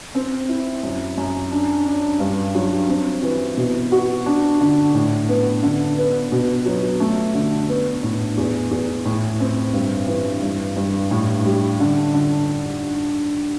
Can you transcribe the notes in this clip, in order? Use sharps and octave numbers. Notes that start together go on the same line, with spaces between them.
C4
E4
F#2
F#2
D4
D4
G2
F#3
C4
E3
B2
F#4
D4
D3
A2
B3
D3
B3
B2
F#3
A3
D3
B3
A2
E2
E2
A2
C4
G2
E3
G2
G2
A2
G3
D3
D3